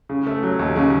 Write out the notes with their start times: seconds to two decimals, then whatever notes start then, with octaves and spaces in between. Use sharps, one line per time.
0.09 C#3
0.27 A3
0.43 F#3
0.59 D#2
0.76 C#3